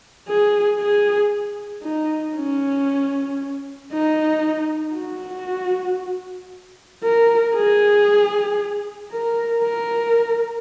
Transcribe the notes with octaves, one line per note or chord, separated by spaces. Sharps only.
G#4
G#4
D#4
C#4
D#4
F#4
A#4
G#4
A#4
A#4